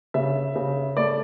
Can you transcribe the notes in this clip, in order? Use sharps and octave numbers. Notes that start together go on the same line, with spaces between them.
C#3 E5
C#3
A3 D5